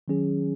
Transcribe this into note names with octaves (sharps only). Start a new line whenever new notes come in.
D#3 F#3 C#4 G#4